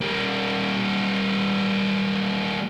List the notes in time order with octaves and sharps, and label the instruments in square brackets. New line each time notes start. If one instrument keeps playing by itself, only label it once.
[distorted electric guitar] G3 A#3